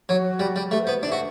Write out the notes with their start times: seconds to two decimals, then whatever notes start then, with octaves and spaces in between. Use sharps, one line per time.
0.09 F#3 F#4
0.40 G3
0.56 G3
0.71 A3 G4
0.79 B4
0.83 C5
0.87 B3
1.03 D4
1.06 E5
1.12 F#4